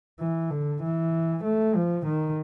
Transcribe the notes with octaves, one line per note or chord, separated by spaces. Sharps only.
E3
D3
E3
A3
F3
D#3